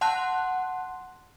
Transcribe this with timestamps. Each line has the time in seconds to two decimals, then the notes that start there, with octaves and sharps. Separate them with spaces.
0.01 F#5 A5 C6 F#6